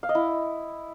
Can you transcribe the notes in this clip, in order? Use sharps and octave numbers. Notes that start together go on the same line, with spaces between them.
F5
D#5
E4